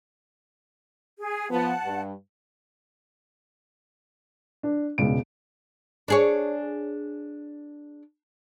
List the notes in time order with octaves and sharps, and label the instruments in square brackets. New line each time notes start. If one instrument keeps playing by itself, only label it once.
[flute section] G#4
[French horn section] F3 B3 [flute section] F#5 A5
[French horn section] G2
[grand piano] D4
E1 C#2 D7
[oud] D4 G#4 C#5